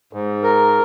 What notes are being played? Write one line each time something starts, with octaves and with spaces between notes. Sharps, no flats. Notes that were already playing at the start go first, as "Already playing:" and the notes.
G#2
A#4